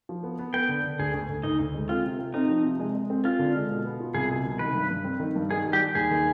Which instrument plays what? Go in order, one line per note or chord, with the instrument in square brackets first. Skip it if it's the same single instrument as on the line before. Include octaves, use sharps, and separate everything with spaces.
[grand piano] F3
B3
B3
[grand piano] B3 [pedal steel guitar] G5
[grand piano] D3
D3
[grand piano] D2 [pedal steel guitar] G#4
[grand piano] D2
D2
[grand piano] D2 [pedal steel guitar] D#4
[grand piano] D2
G#3
[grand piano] C4 [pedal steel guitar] F4
[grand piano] C3
C4
[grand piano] C4 [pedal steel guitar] D#4
[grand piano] F3
C3
G#3
G#3
C4
[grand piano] C4 [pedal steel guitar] F4
[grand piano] D3
G#3
B2
B3
F4
[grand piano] C2 [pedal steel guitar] G#4
[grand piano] B2
C2
[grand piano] D#3 [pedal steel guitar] B4
[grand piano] G2
G2
C4
D#3
G2
[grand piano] D#3 [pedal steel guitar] G#4
[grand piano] G3
[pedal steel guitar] G4
[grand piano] G3
[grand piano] D#2 [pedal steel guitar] G#4
[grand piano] D#3